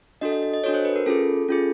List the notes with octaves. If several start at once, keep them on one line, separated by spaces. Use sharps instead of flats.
D4 F#4 A4 D#5
D#5
D#5
D#5
D4 F#4 A4 C#5
C5
B4
A#4
C#4 F4 G#4 A4
C#4 F4 G#4